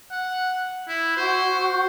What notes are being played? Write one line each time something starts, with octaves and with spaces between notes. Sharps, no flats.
F#5
E4
F#4 C5